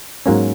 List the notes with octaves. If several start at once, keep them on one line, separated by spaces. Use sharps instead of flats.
G#2 F#3 A#3 C#4